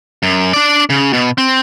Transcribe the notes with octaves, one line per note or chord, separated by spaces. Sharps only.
F#2
D4 D5
C#3
B2
C4